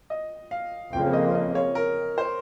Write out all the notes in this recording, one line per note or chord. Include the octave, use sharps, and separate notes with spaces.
D#5
F5
F2 C#3 F3 A#3 G5
D#5
D#5
C#5
A#4
C5